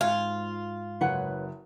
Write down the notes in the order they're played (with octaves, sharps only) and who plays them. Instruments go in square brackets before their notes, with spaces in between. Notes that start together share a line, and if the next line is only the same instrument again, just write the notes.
[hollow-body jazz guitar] G#2 F#4 G#5 [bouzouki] F4
[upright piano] F#1 [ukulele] B4 C#5 F#5